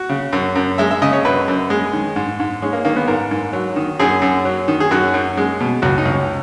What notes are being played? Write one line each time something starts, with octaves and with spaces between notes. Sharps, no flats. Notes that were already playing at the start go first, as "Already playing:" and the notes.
Already playing: F#4
C#3
F#2
F#2
G#3 E5
E5
C#3 D#5
C#5
F#2 B4
F#2
G#3
D#3
G#2
G#2
G#3 C#4
A#3
D#3 A#3
B3
G#2 A#4
G#2
F#3
D#3
F#2 G#4
F#2
F#3
D#3
G#4
F#2 F#4
F#2
G#3
B2
C#2 F#4
D#4
C#2
C#4